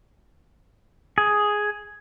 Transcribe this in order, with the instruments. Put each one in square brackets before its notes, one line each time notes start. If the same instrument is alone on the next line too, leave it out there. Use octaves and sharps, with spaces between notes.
[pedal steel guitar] G#4